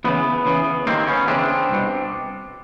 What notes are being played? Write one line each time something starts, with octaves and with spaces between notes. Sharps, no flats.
E2 C#3 E3 B3
E2 C#3 E3
D#2 D#3 A#3 C4
B3 C#4
E2 C#3 E3 C4 D4
C2 B2